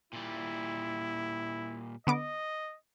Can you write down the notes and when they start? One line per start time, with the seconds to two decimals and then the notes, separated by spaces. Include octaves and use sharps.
0.13 A#2 G3 E4
2.07 D3 B3 D#5 D6